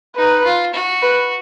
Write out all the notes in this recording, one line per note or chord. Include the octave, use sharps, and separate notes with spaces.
D#4 B4
F4
F#4
B4